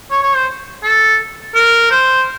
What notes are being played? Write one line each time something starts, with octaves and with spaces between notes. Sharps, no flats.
C#5
C#5
C5
A4
A#4
C5